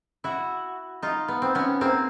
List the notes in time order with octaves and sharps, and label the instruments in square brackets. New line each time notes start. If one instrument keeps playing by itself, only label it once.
[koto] E4 F#4
D#4 F4
B3
C4
B3 C#4
A#3 C4